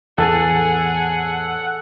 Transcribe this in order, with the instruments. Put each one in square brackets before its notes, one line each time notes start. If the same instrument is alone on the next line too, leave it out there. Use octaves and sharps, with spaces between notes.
[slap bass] E2 A2 E3 [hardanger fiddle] G#4 [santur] A4 A5 [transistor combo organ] F#5